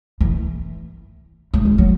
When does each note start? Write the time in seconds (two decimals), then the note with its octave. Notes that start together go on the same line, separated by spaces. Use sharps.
0.21 E3
1.54 A3
1.65 G#3
1.78 F#3